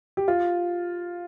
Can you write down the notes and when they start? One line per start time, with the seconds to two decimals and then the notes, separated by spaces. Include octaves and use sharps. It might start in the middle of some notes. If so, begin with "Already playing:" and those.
0.17 G4
0.28 F4